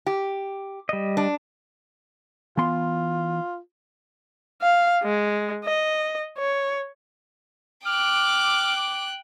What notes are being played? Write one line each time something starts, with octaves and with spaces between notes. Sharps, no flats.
G4
G3 D#5
D4
E3 B3 F4 C6
F5
G#3
D#5
C#5
G5 D6 F6 F#6